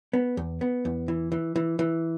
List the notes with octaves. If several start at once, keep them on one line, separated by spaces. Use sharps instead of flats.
B3
E2
B3
E2
E3
E3
E3
E3